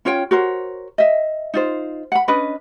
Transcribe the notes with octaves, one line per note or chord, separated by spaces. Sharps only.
C#4 F4 C#5 G5
F#4 A#4 C5 C#5
D#5 E5
D#4 F4 C5
F#5 B5
C#4 D4 B4 D#5